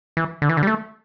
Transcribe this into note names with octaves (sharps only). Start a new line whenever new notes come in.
E3
D3
E3
D3
G3
A3